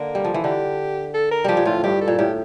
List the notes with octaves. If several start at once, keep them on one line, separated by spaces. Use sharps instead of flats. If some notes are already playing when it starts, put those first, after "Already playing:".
Already playing: D3 A#3
G3
F3
E3
D3 G4
A4
A#4
F3 G3 G4
A#2
A2 F4
G2 G4
A4
A#2
A2 G4